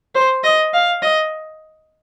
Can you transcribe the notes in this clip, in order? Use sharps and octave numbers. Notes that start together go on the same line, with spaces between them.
C5
D#5
F5
D#5